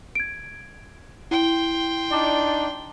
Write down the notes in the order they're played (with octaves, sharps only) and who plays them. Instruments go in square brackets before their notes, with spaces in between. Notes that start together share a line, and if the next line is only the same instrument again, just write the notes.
[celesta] G#6 D7
[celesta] E4 [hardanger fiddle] G5 C6
[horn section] D4 D#4 D5